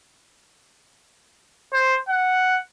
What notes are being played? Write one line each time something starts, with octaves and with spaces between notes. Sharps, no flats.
C5
F#5